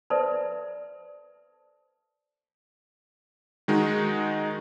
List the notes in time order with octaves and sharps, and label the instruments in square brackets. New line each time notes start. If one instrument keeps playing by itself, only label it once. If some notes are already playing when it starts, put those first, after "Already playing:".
[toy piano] A4 B4 C5 D5 E5 A5
[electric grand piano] D#3 G#3 D#4 F#4